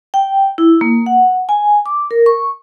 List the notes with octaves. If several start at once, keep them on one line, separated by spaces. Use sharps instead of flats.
G5
E4
A#3
F#5
G#5
D6
A#4
C#6